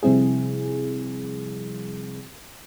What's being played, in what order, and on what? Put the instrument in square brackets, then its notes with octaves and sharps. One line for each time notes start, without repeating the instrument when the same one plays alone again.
[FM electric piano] C3 F3 G3 C4 E4 G#4